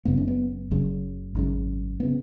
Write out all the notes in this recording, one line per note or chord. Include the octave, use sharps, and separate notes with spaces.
F#1 F#2 C#3 B3
C#4
B3
F#1 F#2 C#3
G#1 F#2 C#3
C#3 B3